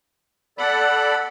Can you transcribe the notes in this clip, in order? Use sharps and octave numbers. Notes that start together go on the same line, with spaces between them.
A4 D5 F#5 B5